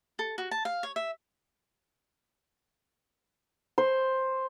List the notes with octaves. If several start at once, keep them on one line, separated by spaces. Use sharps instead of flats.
A4
F#4
A5
F5
C#5
E5
C5